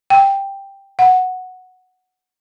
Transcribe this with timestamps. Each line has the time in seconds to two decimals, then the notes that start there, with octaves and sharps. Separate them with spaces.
0.10 G5
0.99 F#5